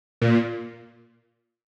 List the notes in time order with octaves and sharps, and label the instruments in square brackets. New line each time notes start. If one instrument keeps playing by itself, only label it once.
[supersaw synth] A#2